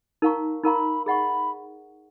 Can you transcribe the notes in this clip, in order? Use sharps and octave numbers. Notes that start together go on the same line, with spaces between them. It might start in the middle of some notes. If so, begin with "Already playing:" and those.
D#4 A#4 F5 A#5 C#6
D#4 A#4 F5 A#5 B5 C#6
G#4 D#5 F#5 B5 C#6